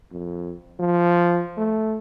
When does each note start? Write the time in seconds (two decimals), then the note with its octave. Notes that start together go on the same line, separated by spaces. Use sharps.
0.11 F2
0.79 F3
1.57 A3